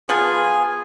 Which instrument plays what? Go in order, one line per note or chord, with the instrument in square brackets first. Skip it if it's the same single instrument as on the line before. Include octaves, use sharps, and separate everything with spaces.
[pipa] F3 B3 F4 [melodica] G#4 G#5